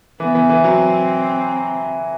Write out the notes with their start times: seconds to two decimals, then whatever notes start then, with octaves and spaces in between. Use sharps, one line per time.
0.20 E3 B3
0.35 E3
0.49 E3
0.64 F#3 C4